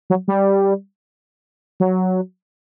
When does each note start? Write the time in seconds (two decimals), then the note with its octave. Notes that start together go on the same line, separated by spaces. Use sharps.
0.10 F#3
0.28 G3
1.80 F#3